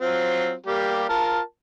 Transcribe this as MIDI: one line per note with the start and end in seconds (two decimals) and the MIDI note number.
0.01 0.54 54
0.01 0.54 60
0.01 0.54 65
0.66 1.07 55
0.66 1.07 58
0.66 1.07 67
1.09 1.40 65
1.09 1.40 70
1.09 1.40 81